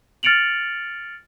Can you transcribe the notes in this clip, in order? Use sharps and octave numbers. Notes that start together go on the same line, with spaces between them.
F6 A6 C#7 D7 F7 F#7